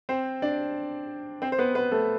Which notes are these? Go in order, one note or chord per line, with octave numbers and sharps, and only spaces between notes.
C4 C5
D4 D5
C4 C5
C5
B3 B4
B3 B4
A3 A4